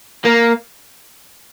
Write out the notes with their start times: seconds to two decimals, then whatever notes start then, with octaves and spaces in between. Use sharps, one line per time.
0.25 A#3